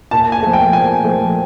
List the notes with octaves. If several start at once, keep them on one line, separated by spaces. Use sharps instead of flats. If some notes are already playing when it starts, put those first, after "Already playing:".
A#2 A5
G#5
F3 A3
G5
A#2 G#5
F3 A3